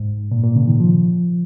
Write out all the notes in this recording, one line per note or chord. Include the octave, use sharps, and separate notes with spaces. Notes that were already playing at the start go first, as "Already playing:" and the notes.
Already playing: G#2
A#2
A#2
C#3
D#3
F3